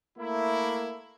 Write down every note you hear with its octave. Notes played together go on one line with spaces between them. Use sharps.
A3 A#3 E4